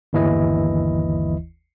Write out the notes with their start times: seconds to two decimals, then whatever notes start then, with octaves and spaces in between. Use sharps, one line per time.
0.13 G1 D#2 E3 E4 D#5